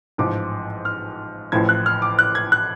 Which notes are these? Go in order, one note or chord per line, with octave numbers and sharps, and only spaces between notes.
A1 G#2 F3 D6
F6
A1 A2 F3 G#6
F#6
F6
D6
F#6
G#6
F#6